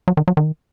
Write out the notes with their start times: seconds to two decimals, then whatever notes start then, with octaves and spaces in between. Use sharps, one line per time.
0.08 F#3
0.17 D#3
0.28 F#3
0.37 D#3